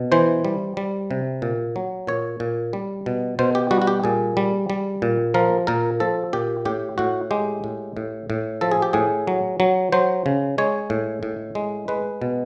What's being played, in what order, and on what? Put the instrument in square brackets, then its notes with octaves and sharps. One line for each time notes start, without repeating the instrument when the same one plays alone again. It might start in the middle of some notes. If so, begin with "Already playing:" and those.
Already playing: [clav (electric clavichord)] B2
E3 C5
G3
G3
C3
A#2
F#3
A#2 C#5
A#2
G3
B2
B2 C5
G4
G3 F#4
F#4
G4
A#2 G#4
G3
G3
A#2
F3 A#4
A#2 A#4
F3 A4
A#2 G4
A2 G4
A2 F#4
G#3 G4
A2
A2
A2
F3 A4
G#4
G4
A2 G#4
F#3
F#3
F#3 C5
C#3
G#3 C#5
A2
A2
G#3
G#3 B4
B2